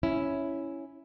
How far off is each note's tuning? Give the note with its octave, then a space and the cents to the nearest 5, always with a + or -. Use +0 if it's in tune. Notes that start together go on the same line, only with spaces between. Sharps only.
C#4 +0 E4 +0